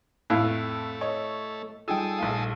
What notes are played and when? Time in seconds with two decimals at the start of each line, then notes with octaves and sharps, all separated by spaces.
0.30 F2 A2 A3 F5 F#6
1.01 C#5 D#5 C#6
1.88 G3 D#4 F4 G#4 A4 G5 D#6 E6
2.18 A#1 A3 F5